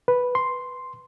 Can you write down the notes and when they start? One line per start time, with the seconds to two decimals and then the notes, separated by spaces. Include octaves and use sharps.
0.08 B4
0.35 C6